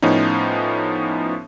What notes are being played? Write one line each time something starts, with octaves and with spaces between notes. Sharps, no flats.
A2 F3 B3 C#4 D#4